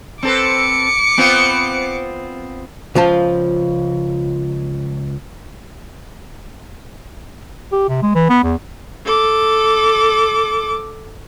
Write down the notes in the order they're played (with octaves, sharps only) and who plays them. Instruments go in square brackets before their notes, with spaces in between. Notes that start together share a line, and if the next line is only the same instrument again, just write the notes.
[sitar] C4 A4 B4 [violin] D6 C#7
[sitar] B3 C4 F4
[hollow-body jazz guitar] C#2 F3 F4 A5
[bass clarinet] G4
C3
G#3
E3
B3
E2
[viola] A4 D6